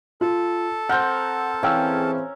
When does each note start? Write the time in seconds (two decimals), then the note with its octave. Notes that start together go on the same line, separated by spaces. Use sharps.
0.21 F4 A4
0.89 C4 A#4 F#5 G6
1.63 E3 C4 C#4 G#4 F5 G5 E6